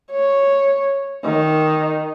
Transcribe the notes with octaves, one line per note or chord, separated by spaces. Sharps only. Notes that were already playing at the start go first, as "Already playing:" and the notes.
C#5
D#3